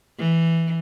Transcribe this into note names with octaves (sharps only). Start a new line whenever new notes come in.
E3